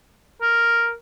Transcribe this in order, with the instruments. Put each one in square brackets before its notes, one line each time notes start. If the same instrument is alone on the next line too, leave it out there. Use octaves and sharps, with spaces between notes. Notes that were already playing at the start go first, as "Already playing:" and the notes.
[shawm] A#4